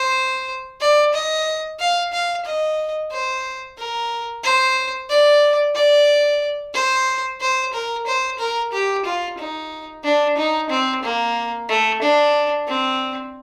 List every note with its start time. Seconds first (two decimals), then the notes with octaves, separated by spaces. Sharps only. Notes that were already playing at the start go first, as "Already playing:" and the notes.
Already playing: C5
0.81 D5
1.13 D#5
1.80 F5
2.13 F5
2.45 D#5
3.11 C5
3.78 A#4
4.43 C5
5.09 D5
5.75 D5
6.74 C5
7.41 C5
7.73 A#4
8.07 C5
8.39 A#4
8.73 G4
9.05 F4
9.38 D#4
10.04 D4
10.37 D#4
10.70 C4
11.03 A#3
11.69 A3
12.02 D4
12.68 C4